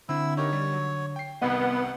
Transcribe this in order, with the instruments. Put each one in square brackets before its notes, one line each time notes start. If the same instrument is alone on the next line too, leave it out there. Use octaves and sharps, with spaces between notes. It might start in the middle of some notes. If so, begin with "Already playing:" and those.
[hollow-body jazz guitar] D3 [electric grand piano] C4 [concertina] E4 E6
[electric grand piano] D#4 G4 A#4 [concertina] C#5
[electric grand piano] G3
F#3
G5 C7
[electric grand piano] C2 C3 D#3 [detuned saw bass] B3 [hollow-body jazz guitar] D#5 [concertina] F#5